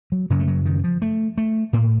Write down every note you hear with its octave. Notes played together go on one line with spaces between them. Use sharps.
F#3
F#2 C#3 F#3
A3
F#3
D#3
F3
A3
A3
A2 A#3